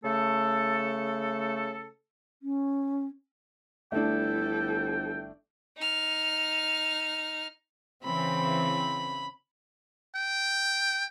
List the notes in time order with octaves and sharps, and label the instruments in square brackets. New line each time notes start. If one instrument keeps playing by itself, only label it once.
[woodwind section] C#3 A3 A4
[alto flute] C#4
[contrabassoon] G1 [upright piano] A3 D4 [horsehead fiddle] E4 A4 [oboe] G5
[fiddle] D#4 F6
[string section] C#3 E3 C4 [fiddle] B5
[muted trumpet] G5